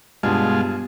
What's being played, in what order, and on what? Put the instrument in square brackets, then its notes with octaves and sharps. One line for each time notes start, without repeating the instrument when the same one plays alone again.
[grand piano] G2 [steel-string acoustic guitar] B2 [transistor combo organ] G#3 F4